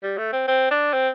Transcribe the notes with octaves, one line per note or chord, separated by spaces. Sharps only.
G3
A3
C4
C4
D4
C4